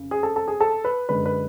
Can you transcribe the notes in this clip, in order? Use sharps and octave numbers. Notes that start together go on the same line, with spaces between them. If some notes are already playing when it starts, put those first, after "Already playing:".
Already playing: F1 C#3
G#4
A4
A4
G#4
A4
B4
F#2 D3 G#3 B4
B4